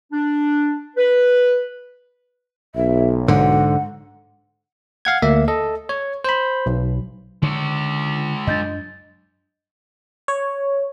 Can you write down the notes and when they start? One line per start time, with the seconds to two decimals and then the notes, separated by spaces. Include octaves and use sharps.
0.12 D4
0.97 B4
2.75 B1 E5
3.28 G#2 D3 F#5
5.05 F5 F#5 G#6
5.22 D2 A#3 E5
5.48 A4 D#5
5.89 C#5
6.24 C5 B5
6.66 B1
7.42 D3 G#3 C#5
8.47 F#2 D4 D#5 G6 A6
10.28 C#5